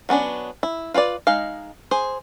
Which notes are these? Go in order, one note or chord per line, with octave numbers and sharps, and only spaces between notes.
F#3 B3 C#4 D4
E4
F4 B4 C#5 D5
G#3 D#4 F5
G#4 C5